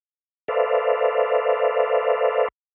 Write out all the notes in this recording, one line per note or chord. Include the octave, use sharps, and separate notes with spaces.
A4 B4 C5 D5 E5 F5